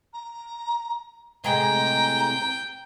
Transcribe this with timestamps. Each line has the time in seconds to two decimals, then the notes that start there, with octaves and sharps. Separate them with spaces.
0.13 A#5
1.44 A2 C3 G#3 G5 A#5